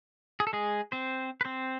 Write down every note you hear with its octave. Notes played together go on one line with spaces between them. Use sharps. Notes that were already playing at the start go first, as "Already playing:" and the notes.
G#4
A4
G#3 G#4
C4 C5
B4
C4 C5